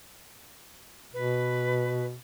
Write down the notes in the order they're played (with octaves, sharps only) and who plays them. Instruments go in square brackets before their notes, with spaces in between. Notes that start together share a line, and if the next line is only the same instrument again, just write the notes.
[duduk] B2 [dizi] B4